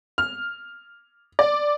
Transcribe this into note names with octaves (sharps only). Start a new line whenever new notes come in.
F6
D5